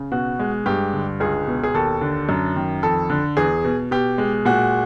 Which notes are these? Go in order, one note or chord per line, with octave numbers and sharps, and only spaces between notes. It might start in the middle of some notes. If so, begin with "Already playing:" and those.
Already playing: C#3
B2 F#4
G#3
G2 G4
D3
C#2 G#4
B2
G#4
D#2 A4
D3
F#2
D#3
F2 A4
D3
E2 G#4
B2
B2 G4
G#3
A#2 F#4